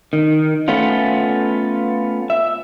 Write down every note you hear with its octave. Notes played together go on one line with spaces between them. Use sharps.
D#3
A3 B3 C#4 F4
E5